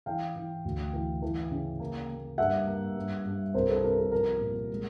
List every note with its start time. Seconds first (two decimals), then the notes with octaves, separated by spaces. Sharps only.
0.06 E3 F5 G5
0.36 E3
0.65 D2
0.93 E3
1.22 E3
1.51 C#3
1.80 A#3
2.09 A#3
2.38 G2 E5 F#5
2.67 A#3
2.96 G2
3.25 G2
3.54 C2 A#4 C5
3.69 A4 B4
3.83 C3 A#4
3.98 A4
4.12 F3 A#4
4.41 A#2
4.70 G#3